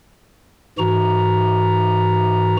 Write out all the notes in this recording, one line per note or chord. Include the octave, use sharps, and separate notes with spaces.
G#2 E3 F#4 A#5